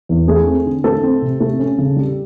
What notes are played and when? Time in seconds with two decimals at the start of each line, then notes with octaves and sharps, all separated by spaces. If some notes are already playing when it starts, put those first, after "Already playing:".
0.09 E2
0.28 A3 G#4
0.47 C4
0.66 D3
0.84 A3 A4
1.03 C4
1.22 C3
1.40 A3
1.59 C#4
1.78 C#3
1.96 G3